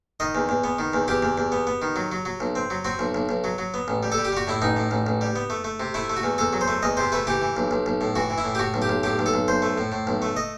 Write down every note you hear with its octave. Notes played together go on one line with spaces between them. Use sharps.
D#3 D#5
E2
E2
B3
D#3
E2
E2 G4
E2
E2
B3
B3
D#3
F#3
F#3
F#3
B1
C4
F#3
C4 F#4
B1
B1
B1
F#3
F#3
B3
A1
G3
A4
G3
G4
G3 F#4
A2 E4
A1 D#4
A2
A1
A1
G3
B3
A3
A3
C3
A3 E4
A3
F#4
E2
E2 A4
F#3
C5
A3
E2 D#5
C3 C5
A3 B4
E3 G4
E3
B1
B1
B1
A2
E3 F#4
E3
E4
A2
G4
A2 F#4
B1
G4
B1
A2 G4
B1
A4
B1
B1 C5
A3
A2
A2
B1
A3
D#5